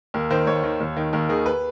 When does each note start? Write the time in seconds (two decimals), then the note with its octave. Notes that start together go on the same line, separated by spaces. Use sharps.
0.14 D#2 A#4
0.30 D#3 C5
0.47 D#2 C#5
0.64 D#3
0.80 D#2
0.97 D#3
1.13 D#2 A#4
1.29 D#3 G#4
1.46 B4